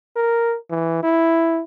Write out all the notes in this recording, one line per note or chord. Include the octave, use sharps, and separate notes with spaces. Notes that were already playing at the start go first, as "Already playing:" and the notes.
A#4
E3
E4